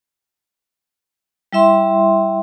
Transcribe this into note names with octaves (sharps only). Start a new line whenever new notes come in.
G3 E4 E5 C6